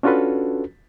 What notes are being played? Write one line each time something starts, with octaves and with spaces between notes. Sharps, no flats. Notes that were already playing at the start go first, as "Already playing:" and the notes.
C#4 D4 F4 F#4 A4 B4